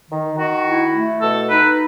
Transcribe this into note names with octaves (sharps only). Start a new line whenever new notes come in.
D#3
D#3 F#4
E4
A3
B2 A4
D#4 B4